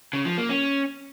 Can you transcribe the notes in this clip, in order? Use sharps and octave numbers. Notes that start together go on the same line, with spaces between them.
C#3
F3
A#3
C#4